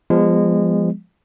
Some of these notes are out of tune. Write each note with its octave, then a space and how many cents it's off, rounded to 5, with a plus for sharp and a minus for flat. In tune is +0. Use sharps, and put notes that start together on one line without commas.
F3 -5 G#3 -25 B3 +0